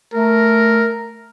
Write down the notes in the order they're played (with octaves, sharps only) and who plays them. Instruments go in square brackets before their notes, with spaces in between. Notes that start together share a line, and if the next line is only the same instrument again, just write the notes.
[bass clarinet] A3 [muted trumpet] A#4